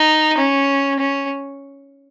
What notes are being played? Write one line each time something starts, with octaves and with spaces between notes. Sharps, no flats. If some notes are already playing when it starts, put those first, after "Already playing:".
Already playing: D#4
C#4
C#4